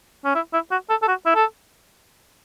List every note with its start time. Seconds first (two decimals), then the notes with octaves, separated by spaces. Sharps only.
0.25 C#4
0.35 E4
0.53 E4
0.71 F#4
0.90 A4
1.02 A4
1.08 F#4
1.26 E4
1.35 A4